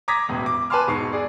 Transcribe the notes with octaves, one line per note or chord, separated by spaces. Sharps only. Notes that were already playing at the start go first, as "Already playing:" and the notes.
A#5 D6 D#6 G#6 A#6 B6
E1 A1
D6
B4 G#5 A5 C6 D6 F6
E1 G#2 C#6 C7
G#4 D5